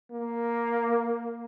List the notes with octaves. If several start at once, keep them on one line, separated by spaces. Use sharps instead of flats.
A#3